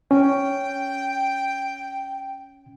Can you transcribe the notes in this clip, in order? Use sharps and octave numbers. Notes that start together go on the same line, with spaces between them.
C#4 G5